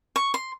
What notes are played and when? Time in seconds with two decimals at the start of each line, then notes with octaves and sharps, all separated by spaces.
0.16 C#6
0.34 C6